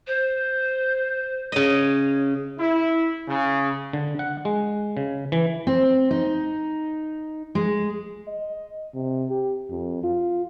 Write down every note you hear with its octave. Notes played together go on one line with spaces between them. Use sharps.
C5
C#3 C#5 D#5
E4
C#3
D3
F#5
G#3
C#3
E3
C4
D#4
G#3
D#5
C3
G4
F2
F4